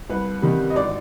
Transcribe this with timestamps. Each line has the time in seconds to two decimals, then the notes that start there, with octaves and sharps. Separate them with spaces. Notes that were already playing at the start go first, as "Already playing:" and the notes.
0.10 C2 B4
0.42 C3 D#3 G3
0.70 D#5
0.75 G#1 D5